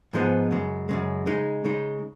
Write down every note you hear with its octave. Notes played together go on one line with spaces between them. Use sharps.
G#2 F3 G#3 B3 D#4
F#2 C#3 G#3
F#2 C#3 G#3
C#3 G#3 D#4
C#3 G#3 D#4